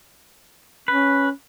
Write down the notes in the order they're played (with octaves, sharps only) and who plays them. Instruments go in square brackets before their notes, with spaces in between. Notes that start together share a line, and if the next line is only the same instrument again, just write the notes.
[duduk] C#4 [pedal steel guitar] B4